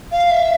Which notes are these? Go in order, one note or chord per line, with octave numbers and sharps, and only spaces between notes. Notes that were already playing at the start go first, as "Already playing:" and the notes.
F5
E5